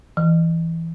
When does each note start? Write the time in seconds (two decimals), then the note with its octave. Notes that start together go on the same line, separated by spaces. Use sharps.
0.17 E3